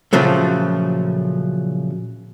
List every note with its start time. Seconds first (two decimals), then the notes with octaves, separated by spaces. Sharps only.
0.13 A#2 C#3 F3 F#3 A3